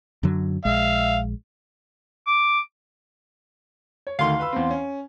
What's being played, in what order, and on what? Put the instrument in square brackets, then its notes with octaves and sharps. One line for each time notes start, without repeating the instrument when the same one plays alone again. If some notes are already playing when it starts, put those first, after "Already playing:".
[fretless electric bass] F#2 D3 F#3
[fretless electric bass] A#1 G#3 [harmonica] E5 F5
[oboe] D6
[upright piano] C#5
[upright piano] D2 D3 D#3 [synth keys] F5 C6
[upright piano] B4 B5 E6
E2 C4
C#4